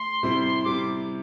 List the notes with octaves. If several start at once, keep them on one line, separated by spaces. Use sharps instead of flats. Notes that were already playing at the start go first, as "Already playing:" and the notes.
Already playing: A3 C6
C3 G3 C4 E4
C3 G3 D6